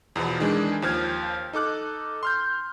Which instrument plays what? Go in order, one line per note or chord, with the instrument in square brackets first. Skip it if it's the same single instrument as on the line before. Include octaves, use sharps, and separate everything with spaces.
[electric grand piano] E2 B2 F3
D#3 E3 G#3 D4
D#2 F3 F6 G#6
D#4 A4 D6 F#6
C6 F6 G6